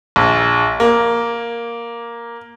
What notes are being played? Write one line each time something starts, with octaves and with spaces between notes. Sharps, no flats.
A#1
A#3